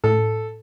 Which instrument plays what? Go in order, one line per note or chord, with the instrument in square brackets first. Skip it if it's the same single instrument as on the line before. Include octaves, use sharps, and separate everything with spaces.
[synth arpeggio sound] A2 [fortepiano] A4